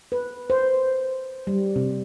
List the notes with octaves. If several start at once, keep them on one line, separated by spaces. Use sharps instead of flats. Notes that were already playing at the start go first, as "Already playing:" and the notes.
B4
C5
G3
C3